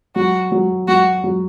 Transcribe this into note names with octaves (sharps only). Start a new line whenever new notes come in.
F#3 F#4
F#3
F#3 F#4
F#3